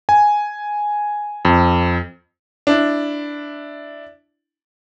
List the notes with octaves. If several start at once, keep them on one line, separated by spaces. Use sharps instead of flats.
G#5
F2
D4 E4